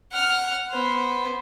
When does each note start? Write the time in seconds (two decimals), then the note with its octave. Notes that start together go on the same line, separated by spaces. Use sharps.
0.12 F#5 F6
0.71 B3 C5